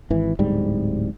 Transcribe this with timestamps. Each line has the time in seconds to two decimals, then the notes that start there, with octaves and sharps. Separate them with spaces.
0.10 G#1 E3
0.39 D1 G#2 G3